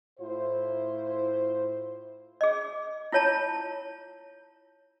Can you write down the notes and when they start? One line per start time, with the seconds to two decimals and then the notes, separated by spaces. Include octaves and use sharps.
0.20 A2 E4 F4 C5
2.41 G#4 D#5
3.12 E4 F4 C#5 A5 A#5